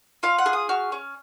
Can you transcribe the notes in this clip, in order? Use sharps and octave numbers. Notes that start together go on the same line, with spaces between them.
F4 F5
F#5
G#4
D#6
F#4 F6
C#4